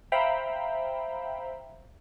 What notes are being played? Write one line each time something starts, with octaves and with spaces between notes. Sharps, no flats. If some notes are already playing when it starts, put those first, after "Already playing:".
C5 E5 F5 G5 A#5 B5